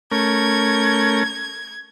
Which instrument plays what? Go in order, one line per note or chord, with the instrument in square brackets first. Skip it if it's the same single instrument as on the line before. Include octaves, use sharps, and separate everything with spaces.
[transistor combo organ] A3 C#4 A#4 [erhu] G#6